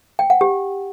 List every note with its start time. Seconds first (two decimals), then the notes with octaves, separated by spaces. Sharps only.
0.19 G5
0.30 F#5
0.41 G4